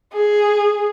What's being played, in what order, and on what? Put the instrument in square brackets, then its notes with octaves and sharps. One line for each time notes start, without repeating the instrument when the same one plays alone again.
[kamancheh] G#4